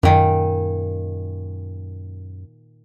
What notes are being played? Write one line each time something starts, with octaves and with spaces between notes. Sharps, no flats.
F#2 A#2 D#3